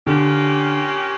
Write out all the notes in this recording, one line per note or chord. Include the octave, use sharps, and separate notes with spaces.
A#2 D3 A#3 C#4 G4